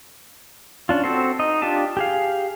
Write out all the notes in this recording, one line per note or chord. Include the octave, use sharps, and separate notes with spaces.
C#4 D4 F4
C4 F#4 A4 C5
D#4 D#5
D4 F4 G4 A5
G4 G#4 F5